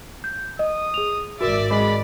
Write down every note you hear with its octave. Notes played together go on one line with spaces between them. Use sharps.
G6
D#5 D#6
G#4 F7
G#1 F#4 A#4 D5 E5
G#3 B5